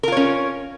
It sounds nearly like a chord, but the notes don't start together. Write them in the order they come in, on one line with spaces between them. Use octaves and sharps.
A#4 F4 C#5 C#4